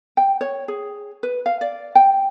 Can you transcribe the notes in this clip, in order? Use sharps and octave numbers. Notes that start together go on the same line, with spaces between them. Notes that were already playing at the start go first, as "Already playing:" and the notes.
G5
C#5
G#4
B4
F5
D5
G5